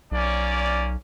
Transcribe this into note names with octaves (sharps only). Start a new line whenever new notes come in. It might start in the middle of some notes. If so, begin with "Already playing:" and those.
B1 A#3 C#4 D5